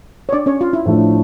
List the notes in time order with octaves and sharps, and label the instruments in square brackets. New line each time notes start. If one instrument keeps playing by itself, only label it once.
[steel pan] C#5
D4 D5
C#4 C#5
F4
E4
[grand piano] A2 F3 A3 D4 A4